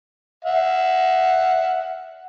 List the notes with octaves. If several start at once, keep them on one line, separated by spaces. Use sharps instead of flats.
E5 F#5